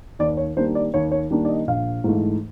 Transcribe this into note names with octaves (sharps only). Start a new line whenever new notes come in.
D#2 D5
C#5
D#3 G3 A#3 D4 C5
D5
D#2 C#5
C#5
D#3 G3 A#3 D4
D5
D#5
A#1 F5
G#2 E3 A3